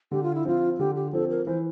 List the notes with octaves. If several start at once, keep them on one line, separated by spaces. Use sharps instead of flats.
D3 G4
F4
E4
F3 C4 F4
D3 G4
G4
F3 C4 A4
A#4
E3 C5